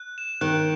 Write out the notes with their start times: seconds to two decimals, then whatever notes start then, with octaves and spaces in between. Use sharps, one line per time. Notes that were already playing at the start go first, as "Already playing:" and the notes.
Already playing: F#6
0.18 E7
0.41 D#3 F#6